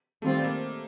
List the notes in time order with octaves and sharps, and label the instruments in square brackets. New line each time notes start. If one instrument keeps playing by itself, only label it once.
[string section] D#3 G3 C4 F4 C5 [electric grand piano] A3
[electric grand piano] A#3